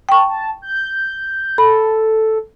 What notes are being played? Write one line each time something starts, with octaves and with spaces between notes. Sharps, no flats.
G5 A5 C#6
A5
G6
A4 B5